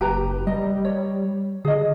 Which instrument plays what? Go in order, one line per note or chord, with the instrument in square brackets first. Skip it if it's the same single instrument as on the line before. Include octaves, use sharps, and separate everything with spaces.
[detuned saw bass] F#1 [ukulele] G4 B4 A#5
[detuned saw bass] G3 [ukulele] D#5
[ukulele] C#5
[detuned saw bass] D3 [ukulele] G#4 D#5